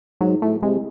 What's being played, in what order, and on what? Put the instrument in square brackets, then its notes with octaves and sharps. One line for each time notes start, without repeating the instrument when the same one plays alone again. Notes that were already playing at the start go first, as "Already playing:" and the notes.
[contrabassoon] G#2 [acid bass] F#3
[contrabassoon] A2 [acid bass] A3
[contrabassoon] C3 [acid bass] G#3